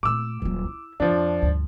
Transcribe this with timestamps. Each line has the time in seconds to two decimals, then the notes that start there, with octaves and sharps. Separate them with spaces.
0.03 A#2 A3 D6 E6
0.42 D#1 F#3
0.65 E4
1.00 F2 F3 D4
1.42 D2 G2